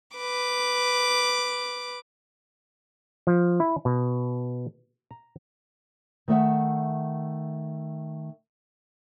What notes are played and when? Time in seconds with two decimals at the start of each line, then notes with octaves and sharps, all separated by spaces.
0.17 B4 D6
3.27 F3
3.60 E4
3.85 B2
5.11 A#5
6.28 D#3 A3 E5 F#5